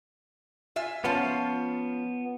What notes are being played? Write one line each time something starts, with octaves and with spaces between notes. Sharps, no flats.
F4 E5 G#5
F3 B3 C#4 F4